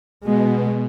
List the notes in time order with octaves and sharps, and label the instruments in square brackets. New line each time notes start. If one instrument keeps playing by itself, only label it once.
[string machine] B2 [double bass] G#3